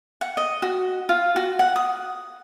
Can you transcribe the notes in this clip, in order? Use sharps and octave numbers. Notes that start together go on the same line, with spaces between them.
F#5
D#5
F#4
F4
F#4
F#5
D#6